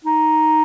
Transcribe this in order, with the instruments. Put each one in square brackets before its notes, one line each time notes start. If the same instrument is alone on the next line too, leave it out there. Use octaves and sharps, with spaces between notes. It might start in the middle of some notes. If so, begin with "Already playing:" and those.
[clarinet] D#4